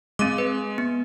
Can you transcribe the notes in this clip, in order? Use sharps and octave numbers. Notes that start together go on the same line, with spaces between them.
G#3 C4 D6 D#7
B4
B3